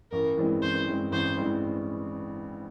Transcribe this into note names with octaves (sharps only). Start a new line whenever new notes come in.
A1 A#4
G2 E3 G#3 C4
A1 C5
G2 E3 G#3 C4
A1 C5
G2 E3 G#3 C4